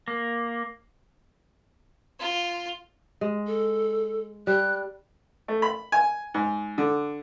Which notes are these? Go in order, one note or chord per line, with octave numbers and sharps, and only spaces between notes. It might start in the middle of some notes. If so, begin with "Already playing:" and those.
A#3
F4
G#3
A4
G3 F#6
A3
B5
G#5
G#2
D3